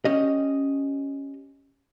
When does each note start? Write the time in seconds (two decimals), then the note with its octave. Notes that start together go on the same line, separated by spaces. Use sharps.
0.05 C#4 G4 D#5